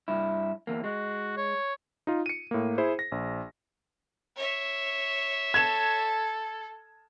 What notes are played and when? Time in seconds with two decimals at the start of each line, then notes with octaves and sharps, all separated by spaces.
0.08 G2 E4
0.67 E2 A#3
0.84 G#3 F#4
1.37 C#5
2.07 D#4 F4
2.26 C#7 D#7
2.51 A2 A#3
2.78 E4 G#4 C5
2.99 A#6
3.12 A#1
4.36 C#5 E5
5.54 A4 G#6 E7